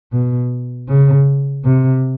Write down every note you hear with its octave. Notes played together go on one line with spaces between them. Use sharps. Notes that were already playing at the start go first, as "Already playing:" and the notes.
B2
C#3
C3